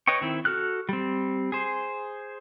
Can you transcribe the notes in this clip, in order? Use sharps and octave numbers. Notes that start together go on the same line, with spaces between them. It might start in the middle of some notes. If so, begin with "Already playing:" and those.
B4 C#5 D#5 G5 C#6
D#3 C4 E4
F#4 A4 F6 F#6
G3 C4
G#4 C5